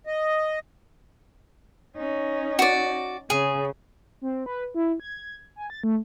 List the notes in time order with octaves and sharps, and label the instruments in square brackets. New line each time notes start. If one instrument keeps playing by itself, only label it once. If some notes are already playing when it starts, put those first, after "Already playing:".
[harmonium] D#5
[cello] C#4 D#4
[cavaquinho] F#4 D5
[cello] C#3 [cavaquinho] G#4
[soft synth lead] C4
B4
E4
G#6
G#5
A6
A3